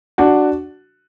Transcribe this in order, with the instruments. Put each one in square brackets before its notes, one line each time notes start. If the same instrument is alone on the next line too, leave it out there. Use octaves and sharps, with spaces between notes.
[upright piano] D4 F#4